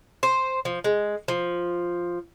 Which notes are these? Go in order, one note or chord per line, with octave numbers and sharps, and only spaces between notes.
C5
F3
G#3
F3